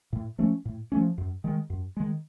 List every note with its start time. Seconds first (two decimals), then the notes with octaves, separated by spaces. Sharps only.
0.13 A2
0.38 F3 A3 C#4
0.65 A2
0.92 F3 A3 C#4
1.18 F#2
1.44 D#3 G#3
1.70 F#2
1.97 D#3 G#3